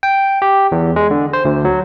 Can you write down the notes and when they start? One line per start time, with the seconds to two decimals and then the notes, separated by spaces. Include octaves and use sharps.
0.03 G5
0.42 G4
0.72 E2
0.96 G#3
1.11 D3
1.33 C5
1.45 D2
1.65 F#3